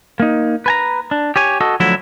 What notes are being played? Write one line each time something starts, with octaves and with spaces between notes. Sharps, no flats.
A#3 D#4
B4 G#5 A#5
D4
G4 C#5 G#5
F#4 A4 D#5
D3 F3 F#3 A3 E4